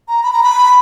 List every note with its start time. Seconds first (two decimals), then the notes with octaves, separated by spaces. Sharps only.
0.08 A#5
0.23 B5
0.33 A#5
0.43 B5